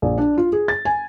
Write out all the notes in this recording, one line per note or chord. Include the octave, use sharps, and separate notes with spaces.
A#1
D4
F4
G#4
A6
G#5